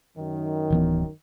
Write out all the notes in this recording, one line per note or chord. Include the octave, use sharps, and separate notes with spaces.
F#2 D#3
D1 E3 B3